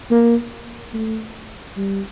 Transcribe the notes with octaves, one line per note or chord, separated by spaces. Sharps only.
A#3
A3
G3